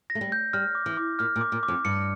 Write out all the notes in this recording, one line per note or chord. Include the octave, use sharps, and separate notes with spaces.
A#6
A3
G3
G6
G3 F6
D6
E3
D6
A#2 F6
A#2
D6
A#2
D6
F2
G2 C#7